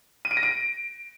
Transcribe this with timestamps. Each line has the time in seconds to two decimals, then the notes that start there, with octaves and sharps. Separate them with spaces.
0.25 D#7
0.31 D7
0.37 A#6
0.43 D7